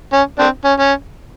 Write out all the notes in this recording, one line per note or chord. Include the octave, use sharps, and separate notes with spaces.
C#4
C4 D4
C#4
C#4